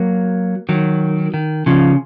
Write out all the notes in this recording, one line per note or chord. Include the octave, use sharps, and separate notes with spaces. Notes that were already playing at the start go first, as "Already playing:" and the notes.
Already playing: F#3 A#3
D#3 F#3
D#3
C#3 F3